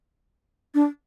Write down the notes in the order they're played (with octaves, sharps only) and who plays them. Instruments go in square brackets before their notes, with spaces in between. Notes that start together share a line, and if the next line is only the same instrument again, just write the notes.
[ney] D4